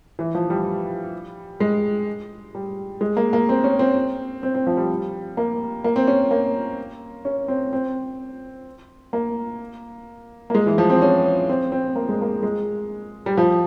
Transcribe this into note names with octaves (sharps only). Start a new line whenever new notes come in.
E3
F3
G3
G#3
G3
G#3
A#3
A#3
C4
C#4
C4
C4
C4
F3
G3
A#3
A#3
C4
C#4
A#3
C#4
C4
C4
A#3
A#3
G#3
E3
F3
C4
C#4
C4
C4
A#3
G#3
A#3
G#3
G3
F3